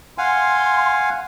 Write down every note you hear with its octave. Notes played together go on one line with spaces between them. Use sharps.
F5 F#5 G#5 C6